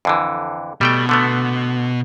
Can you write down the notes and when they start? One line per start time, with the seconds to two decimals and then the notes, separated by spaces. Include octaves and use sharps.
0.05 F2 D3 E3
0.81 B2 G3 A3 G5
1.09 D3 A3 B3